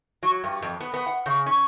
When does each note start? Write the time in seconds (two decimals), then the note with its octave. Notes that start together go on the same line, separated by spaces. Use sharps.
0.23 F#3
0.44 G2
0.62 F2
0.81 B3
0.94 B3
1.06 F#5
1.26 C#3
1.46 C#4